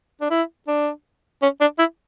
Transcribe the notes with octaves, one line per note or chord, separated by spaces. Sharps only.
D4
E4
D4
C#4
D4
E4